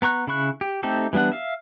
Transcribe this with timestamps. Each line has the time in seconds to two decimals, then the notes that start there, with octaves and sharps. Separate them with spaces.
0.02 B3 A#5 C#6 F#6
0.27 C#3 E4 B5 C#6 F#6
0.61 G4
0.83 A3 C4 D#4 G4 A4
1.13 E3 G3 B3 D4 F#5
1.32 E5 F5